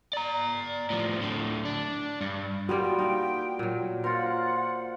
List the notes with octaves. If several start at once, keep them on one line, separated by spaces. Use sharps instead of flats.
D5 A#5
A2 F3
A2 D3
D4
G2
G3 A#3 B3 F4 F#4 D5 G5
D#4 G5
A#2 F#3
F4 A#4 C5 F#5